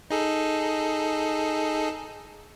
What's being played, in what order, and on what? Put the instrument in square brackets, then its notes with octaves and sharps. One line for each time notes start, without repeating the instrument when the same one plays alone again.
[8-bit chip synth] D#4 G#4 A4